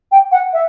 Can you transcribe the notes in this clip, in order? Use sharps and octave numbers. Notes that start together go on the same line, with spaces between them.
G5
F#5
E5